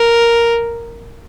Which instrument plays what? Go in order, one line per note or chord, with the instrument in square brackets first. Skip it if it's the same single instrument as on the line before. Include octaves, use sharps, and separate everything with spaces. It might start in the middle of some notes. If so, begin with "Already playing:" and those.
Already playing: [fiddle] A#4